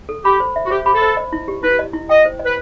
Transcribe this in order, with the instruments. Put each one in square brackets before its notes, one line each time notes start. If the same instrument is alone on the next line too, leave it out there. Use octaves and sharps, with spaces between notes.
[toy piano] A4
[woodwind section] G4 [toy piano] B5
[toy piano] C5
E5
[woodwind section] F#4
[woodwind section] G4 [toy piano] C5
[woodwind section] G4 [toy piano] B5
[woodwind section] A4
[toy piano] C5
D#5
E4
G4
[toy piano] E4 [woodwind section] B4
[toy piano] D#5
E4
[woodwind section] D#5 [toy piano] G5
[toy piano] C5
D#5
[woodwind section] B4